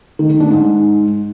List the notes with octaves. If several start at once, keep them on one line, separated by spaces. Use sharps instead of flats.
D#3
D#3
D4
G#2